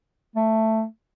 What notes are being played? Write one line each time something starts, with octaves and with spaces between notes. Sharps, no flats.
A3